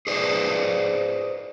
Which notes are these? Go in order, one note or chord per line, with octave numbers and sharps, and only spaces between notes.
G#4 B4 C5 D5